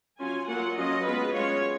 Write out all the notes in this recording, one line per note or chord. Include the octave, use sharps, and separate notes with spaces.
F#3 C#4 F4 G#5
F#3 A#3 F4 F#5
F#3 C#4 F4 D#5
G#3 B3 F4 B4
G#3 C#4 F4 C#5